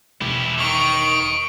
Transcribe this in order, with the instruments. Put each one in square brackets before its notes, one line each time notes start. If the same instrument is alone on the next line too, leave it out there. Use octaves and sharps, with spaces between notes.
[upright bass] E1 [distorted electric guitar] E4 G4
[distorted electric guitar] D#3 [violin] C#6 D7